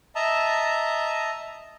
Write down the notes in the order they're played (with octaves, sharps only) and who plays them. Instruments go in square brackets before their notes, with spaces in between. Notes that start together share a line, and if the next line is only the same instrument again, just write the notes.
[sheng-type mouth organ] D#5 E5 A5 A#5